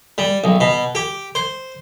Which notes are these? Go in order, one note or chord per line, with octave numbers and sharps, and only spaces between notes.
G3
B1
B2
G4
C5